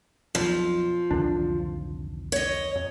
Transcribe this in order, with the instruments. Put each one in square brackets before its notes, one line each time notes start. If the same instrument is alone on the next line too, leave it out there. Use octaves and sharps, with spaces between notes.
[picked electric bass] B1 F2 [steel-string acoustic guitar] F3
[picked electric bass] D1 D3 D4 [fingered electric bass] C2 F2 D#3
[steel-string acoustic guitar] C#5 D#5
[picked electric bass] F2